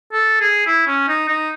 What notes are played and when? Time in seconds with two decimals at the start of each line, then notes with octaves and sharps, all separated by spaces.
0.13 A4
0.41 G#4
0.67 E4
0.87 C#4
1.08 D#4
1.28 D#4